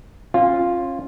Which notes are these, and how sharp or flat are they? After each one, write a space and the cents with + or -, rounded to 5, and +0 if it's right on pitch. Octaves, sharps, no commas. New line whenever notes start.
C#4 -35 F4 +0